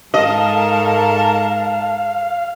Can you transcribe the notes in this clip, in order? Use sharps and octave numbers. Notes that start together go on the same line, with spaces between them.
G#2 A4 A#4 D#5 F5 A5